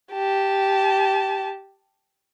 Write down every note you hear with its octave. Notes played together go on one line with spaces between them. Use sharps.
G4 A5